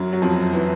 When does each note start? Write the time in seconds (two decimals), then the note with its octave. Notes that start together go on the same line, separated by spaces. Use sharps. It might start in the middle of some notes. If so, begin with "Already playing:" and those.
Already playing: F#2 F#3
0.13 F#3
0.22 F2 F3
0.53 E3